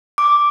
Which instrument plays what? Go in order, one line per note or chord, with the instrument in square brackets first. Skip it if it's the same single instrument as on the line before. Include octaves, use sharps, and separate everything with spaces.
[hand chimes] D6